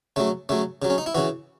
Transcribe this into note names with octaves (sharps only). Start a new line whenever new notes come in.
C#3 F#3 A3
C#3 F#3 A3
C#3 F#3
C#4
D#4
E4
C#3 E3 F#4